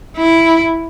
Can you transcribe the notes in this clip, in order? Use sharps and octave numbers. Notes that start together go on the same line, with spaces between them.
E4